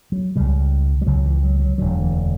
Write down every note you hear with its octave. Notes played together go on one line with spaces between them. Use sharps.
F#3
C#2 C#3 G3
G3
C#2 C#3 F#3
E3
F#3
F#3
E1 D2 D3 F#3
E3